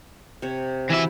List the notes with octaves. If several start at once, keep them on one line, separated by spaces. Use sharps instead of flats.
C3 C#5
E3 E4 F#4 E5